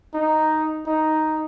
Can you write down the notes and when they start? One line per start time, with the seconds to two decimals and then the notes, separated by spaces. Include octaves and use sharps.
0.14 D#4
0.86 D#4